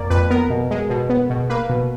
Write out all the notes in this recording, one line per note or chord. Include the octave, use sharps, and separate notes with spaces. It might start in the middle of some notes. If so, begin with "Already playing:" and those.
Already playing: F2 A#3 D5
F2 B4
B3 A#4
B2
G#3
B2
B3
B2
A#3 B4
B2